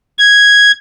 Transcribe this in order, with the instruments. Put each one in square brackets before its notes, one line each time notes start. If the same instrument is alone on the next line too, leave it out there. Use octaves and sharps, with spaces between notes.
[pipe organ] G#6